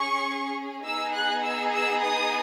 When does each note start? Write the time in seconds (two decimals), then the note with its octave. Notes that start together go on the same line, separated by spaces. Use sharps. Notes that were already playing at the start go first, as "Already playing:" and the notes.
Already playing: C#4 G#4 C#6
0.85 B3 D#4 G#4 E6
1.15 F#6
1.43 E6
1.73 E6
2.02 D#6